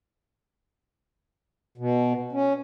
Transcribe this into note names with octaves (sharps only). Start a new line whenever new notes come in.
B2
C#4